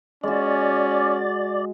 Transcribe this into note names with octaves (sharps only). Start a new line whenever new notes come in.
G#3 C#4 F#4 D5